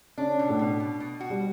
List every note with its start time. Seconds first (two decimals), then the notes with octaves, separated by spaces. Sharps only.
0.18 C#3 C#4 D4
0.39 B2
0.49 A2 A3
0.59 B2
0.80 B2
1.00 B2
1.20 F#4
1.30 G3